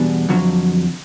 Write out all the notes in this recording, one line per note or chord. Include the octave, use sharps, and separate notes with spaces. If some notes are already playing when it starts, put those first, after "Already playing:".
Already playing: E2 B2 G3 B3 D4
F2 D3 F#3